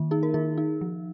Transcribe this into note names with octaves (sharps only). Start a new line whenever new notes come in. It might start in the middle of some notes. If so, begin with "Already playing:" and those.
Already playing: D#3 A#3
D#4 G#4
A#4
D#3 G#4
D#4
F3